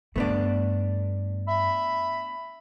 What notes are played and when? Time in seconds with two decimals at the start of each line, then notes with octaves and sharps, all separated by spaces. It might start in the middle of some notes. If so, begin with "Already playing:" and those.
0.16 G2 A3 B3 D4
1.48 E5 B5